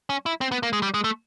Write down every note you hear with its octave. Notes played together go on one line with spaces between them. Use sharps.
C#4
E4
C4
B3
A#3
G#3
G3
G#3
A3